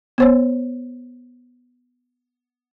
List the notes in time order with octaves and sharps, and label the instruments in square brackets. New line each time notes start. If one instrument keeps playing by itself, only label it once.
[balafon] B3 C5 C#5